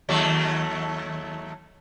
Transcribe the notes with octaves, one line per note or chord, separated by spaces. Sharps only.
D#2 F#3 A3